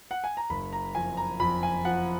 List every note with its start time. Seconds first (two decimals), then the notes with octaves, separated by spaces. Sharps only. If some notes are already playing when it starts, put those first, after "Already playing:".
0.11 F#5
0.24 G#5
0.37 A#5
0.50 F#1 B5
0.73 A#5
0.95 F2 G#5
1.17 A#5
1.40 F2 B5
1.63 G#5
1.84 F3 F#5